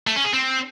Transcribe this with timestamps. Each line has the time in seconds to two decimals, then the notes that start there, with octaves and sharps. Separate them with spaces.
0.07 A3
0.16 C#4
0.25 G#4
0.33 C4